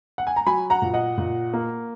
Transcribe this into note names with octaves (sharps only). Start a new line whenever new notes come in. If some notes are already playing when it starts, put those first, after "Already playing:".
F#5
G#5
A#5
F#3 G#5 B5
F#5 A#5
A#2
D#5 F#5
A#2
A#3